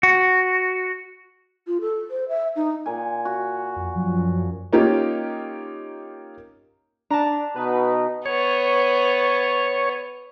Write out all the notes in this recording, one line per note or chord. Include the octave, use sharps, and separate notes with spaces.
F#4
F4
A4
C5
E5
D#4
A#2 G#5
F#4
F2
F#2 F3 F#3
A#3 C#4 D#4 F4 G4
D4 A5 A#5
B2 D#4 B4
B3 C#5